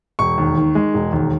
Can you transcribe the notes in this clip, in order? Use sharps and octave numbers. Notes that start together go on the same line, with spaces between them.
E1 C#6
D#2
D#3
G#3
E1
D#2